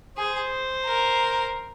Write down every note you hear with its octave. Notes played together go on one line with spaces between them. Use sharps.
G#4 C5
A#4